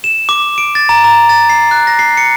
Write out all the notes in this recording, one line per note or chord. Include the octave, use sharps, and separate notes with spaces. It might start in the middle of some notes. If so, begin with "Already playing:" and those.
E7
D6
D7
A6
A#5
A#5
A6
C7
F#6
A#6
C7
C#7